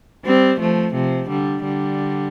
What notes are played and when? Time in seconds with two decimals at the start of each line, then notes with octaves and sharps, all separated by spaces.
0.25 G3 C4
0.60 F3 A3
0.94 C3 F3
1.29 D3 G3
1.64 D3 G3